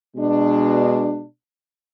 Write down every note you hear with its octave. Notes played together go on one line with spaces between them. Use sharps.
B2 G#3 D4